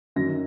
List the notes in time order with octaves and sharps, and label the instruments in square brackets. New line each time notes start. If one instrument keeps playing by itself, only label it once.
[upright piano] F#2 D#3 F#3 A#6